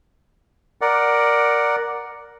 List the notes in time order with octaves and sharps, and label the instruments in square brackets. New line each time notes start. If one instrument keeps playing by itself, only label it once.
[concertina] A#4 D5 F#5